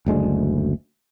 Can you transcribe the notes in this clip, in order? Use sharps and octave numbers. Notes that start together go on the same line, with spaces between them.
F#1 D2 G#3 D4